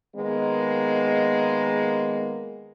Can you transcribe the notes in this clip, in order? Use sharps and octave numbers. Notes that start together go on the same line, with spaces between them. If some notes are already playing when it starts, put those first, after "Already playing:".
D#3 G#3 A#3 B3